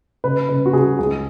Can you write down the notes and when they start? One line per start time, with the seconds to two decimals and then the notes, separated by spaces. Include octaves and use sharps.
0.24 C#3 B4
0.49 C#3 B4
0.66 F#4
0.73 C#3 G#4
0.99 C#2 G#4